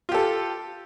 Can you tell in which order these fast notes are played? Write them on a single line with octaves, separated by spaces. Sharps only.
F4 G4 A4